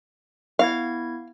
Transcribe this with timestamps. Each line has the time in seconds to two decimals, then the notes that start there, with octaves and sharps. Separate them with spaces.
0.59 B3 E4 F5 G#6